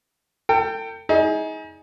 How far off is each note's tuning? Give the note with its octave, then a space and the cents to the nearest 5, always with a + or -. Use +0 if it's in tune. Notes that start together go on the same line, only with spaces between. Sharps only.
A4 +40 G5 +0
D#4 +35 G#4 +10 D5 +30